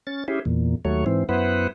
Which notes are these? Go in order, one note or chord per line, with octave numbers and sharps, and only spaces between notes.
C#4 A6
C#4 E4 G4 G#4
E2 A#2
D#2 F#3 A3 C#5
G#2 E3 C4
F#2 B3 E4 B4 C5 F#5